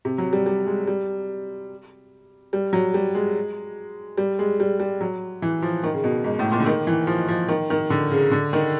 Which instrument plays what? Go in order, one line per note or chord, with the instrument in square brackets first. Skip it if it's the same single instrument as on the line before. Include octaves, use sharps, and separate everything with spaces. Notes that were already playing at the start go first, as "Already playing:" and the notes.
[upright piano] C3
F#3
G3
G3
G#3
G3
G3
F#3
G3
G#3
G3
G#3
G3
G3
F#3
E3
F3
D#3
C#3
B2
G#2
A2
A#2
D3
D#3
E3
F3
F3
D#3
D#3
D3
C#3
D3
D#3